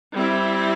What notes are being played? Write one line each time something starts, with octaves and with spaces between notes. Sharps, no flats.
G3 C4 E4